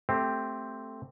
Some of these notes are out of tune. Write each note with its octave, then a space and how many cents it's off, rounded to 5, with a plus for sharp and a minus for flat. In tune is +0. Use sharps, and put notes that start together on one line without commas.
A3 +5 C4 +0 G4 +0